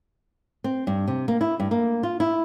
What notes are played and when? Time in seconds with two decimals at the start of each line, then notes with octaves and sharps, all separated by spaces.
0.64 C4
0.87 G2
1.08 C3
1.28 A#3
1.41 E4
1.60 G2
1.71 A#3
2.03 F4
2.20 E4